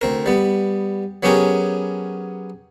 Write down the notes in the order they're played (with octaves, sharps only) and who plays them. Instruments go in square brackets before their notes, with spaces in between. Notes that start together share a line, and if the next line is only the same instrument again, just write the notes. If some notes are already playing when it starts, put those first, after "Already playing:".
[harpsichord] D2 C4 A#4
G3 B3
F#3 B3 C#4 G4 G#4 A#4